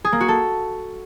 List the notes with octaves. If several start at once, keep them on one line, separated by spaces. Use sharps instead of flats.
G#4
A#3
F#4
A4